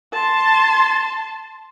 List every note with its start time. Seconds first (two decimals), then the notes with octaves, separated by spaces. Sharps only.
0.13 A5 C6